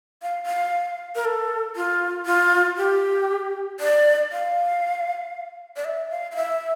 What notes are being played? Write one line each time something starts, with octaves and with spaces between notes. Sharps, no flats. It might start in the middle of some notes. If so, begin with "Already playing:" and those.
F5
F5
A#4
A4
F4
F4
G4
D5
F5
D5
E5
F5
F5
E5